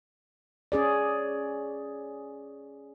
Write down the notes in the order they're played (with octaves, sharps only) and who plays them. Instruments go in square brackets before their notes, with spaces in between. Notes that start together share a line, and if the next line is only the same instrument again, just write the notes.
[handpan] C#4 G#4 D5